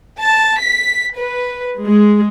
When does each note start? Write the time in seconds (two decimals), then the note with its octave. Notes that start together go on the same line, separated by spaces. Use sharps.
0.19 A5
0.60 B6
1.17 B4
1.83 G#3